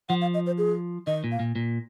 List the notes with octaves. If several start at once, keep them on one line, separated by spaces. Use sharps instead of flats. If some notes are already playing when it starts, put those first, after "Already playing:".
F3 F#5
F5
D#5
C5
G#4
D#3 D#5
A#2
F5
A#2
A#2